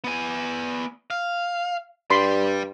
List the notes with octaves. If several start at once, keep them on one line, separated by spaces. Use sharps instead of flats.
B3 G#5
F5
G2 D5 G5 B5 C6